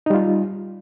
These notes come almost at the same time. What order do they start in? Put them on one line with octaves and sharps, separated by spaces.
D#4 G3 F4